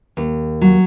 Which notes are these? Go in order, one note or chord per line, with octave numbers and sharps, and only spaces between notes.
D#2
F#3